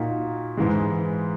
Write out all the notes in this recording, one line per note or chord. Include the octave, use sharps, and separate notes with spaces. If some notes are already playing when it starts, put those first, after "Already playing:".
Already playing: A#2 A#3 D#4 F#4
G#2 E3 G#3